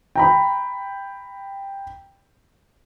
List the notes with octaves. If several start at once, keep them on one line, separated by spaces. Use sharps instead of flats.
G5 A#5 B5